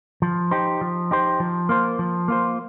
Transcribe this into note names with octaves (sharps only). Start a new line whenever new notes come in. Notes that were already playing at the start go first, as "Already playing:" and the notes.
F3
D#4 G4 C5
F3
D#4 G4 C5
F3
A#3 F4 C5
F3
A#3 F4 C5